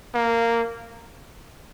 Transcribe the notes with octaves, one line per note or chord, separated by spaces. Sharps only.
A#3